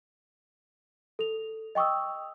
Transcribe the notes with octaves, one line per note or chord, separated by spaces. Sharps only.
A4 F7
D#5 G5 C#6 D#6 E6